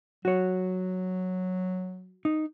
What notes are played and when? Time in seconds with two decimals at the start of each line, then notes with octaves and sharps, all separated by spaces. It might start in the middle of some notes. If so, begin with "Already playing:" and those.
0.25 F#3 F#4 C#5
2.25 D#4